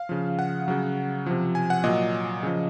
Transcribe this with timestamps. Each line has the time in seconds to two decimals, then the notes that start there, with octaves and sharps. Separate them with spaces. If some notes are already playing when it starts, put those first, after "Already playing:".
Already playing: F5
0.09 C#3 F3
0.39 F#5
0.68 C#3 F#3
1.26 C3 F3
1.55 G#5
1.70 F#5
1.84 A#2 F#3 D#5
2.43 C#3 F3